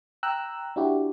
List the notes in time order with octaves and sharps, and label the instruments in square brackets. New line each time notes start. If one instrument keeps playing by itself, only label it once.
[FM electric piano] G5 A#5 E6 F#6
D4 E4 F#4 G4